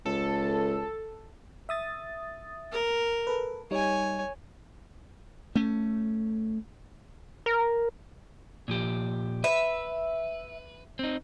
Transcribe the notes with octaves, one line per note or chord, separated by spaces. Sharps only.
C#2 A4
E5 D#6 A6
A#4
A4 B4
G3 D#4 C#5 G#5
A3 C#4
A#4
A#2 F3 G4
B4 E5
C4 D#4